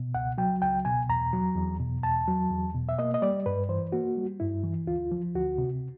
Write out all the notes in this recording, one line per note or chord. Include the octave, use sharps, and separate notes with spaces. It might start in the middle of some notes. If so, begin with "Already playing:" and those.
Already playing: B2
C#2 F#5
F#3 G5
C#2 G5
B2 G#5
E2 A#5
F#3
E2
B2
E2 A5
F#3
E2
B2
E5
A#3 D#5
D#5
G3 D5
G2 B4
E3 C5
A#3 F#4
G3
G2 E4
E3
D2 F4
F3
D2 F#4
C3